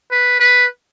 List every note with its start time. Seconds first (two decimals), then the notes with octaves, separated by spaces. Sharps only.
0.12 B4
0.40 B4